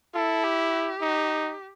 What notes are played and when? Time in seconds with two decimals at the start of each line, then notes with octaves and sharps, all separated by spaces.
0.15 E4 A4
0.44 G4
1.02 D#4